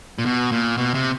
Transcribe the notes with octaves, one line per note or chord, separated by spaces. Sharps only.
A#2
B2
A#2
B2
C3